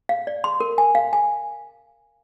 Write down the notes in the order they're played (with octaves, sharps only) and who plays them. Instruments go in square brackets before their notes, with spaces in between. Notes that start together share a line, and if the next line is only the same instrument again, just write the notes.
[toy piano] F5
D5
C6
A#4
G#5
F5
G#5